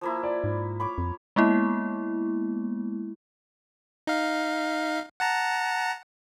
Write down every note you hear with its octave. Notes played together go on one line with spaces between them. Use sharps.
F3 A#3 E4
D5
G#2
C#5 B5 D6
F2
G#3 A#3 B3 E4
D#4 F5
F#5 A5 A#5